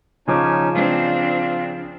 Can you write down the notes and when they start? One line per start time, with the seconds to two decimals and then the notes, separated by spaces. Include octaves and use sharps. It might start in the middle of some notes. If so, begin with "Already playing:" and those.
0.28 C#3 F3 C#4 D#4 G#5 D6
0.74 C4 D4 F4